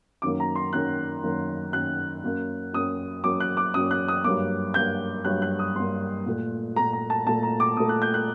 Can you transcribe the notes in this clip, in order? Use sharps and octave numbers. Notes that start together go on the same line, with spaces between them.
F#2 D#3 F#3 A#3 D6
A#5
C6
F#2 D#3 F#3 A#3 F#6
F#2 D#3 F#3 A#3
F#2 D#3 F#3 A#3 F#6
F#2 F#3 A#3
F#2 F#3 A#3 D#6
F#2 F#3 A#3 D6
F#6
D6
F#2 F#3 A#3 D#6
F#6
D#6
G2 F#3 A#3 D6
G2 F#3 A#3 G6
G2 F#3 A#3 F#6
F#6
D#6
G2 F#3 A#3 C6
A#2 A3
A#2 A3 A#5
A#5
A5
A#2 A3 A5
A#5
D6
A#2 A3 D#6
F#6
G6
F#6